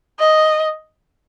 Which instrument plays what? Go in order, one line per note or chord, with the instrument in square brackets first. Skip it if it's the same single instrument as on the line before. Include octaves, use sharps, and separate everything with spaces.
[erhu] D#5